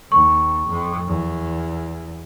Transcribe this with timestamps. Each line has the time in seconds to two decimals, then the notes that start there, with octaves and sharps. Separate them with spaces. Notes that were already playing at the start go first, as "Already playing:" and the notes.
0.12 D#2 C#6
0.69 F2
1.07 E2